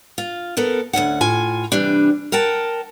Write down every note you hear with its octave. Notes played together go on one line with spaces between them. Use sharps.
F4
B3 A4 A#4
D2 A#2 C#4 F#5
A2 F4 G#5
C3 E3 G3 D4
A#4 F#5 G5 A5